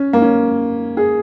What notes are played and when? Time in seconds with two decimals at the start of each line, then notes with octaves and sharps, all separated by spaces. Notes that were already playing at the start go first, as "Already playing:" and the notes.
Already playing: C#4
0.13 A#3
0.22 C#4
0.97 G#4